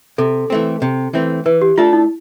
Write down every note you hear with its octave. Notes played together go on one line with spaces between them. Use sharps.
C3 A4
E3 A3 C4
C3
E3 A3 C4
E3 B4
G4
A3 D4 F4 A4
E4